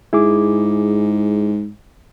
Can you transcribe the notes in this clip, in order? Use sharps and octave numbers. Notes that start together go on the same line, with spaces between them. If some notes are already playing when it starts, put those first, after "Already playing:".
G#2 E4 G#4 D6